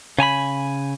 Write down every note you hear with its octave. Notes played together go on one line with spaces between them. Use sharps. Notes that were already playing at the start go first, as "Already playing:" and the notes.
C#3 G#5 A#5 B5